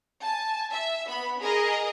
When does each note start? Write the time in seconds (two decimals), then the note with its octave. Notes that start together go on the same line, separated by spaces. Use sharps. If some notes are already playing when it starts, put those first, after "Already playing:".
0.21 G#5 A5
0.72 E5
1.08 B3 B5
1.39 G#4 A#4 D#5